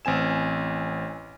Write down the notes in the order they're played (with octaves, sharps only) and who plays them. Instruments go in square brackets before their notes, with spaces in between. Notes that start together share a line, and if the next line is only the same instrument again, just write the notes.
[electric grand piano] A1 C4 G#5 E7